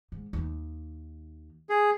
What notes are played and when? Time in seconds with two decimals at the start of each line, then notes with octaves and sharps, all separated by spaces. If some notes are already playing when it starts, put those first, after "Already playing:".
0.12 G#2
0.33 D#2 D#3
1.69 G#4